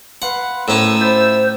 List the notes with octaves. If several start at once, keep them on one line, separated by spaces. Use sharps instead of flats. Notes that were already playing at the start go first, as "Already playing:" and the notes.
B4 F5 F#5 C6
A2 C#4 A#4 C5 E6
E4 F4 C5